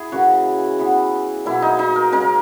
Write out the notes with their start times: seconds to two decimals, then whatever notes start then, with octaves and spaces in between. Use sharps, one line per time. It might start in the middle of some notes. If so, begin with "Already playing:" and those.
Already playing: E4 G#4
0.12 C#3 E3 A#3 F#4
0.79 E3 B3
1.45 B2 F#3 A#3 E4
1.62 D#4
1.79 D#4
1.96 A#4
2.12 C#3 G#3 C#4 A#4